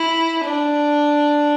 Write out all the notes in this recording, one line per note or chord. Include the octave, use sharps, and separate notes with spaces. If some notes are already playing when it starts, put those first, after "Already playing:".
Already playing: E4
D4